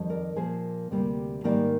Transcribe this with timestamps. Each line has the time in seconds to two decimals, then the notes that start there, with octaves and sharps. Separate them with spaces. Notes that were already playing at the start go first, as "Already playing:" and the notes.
Already playing: F2 D#3 G3
0.10 A#4 D5
0.36 A#2 F3 A#3 G#4 C5
0.91 D2 C3 G3 A#3
1.44 G#2 D#3 G3 A#3 A#4 D5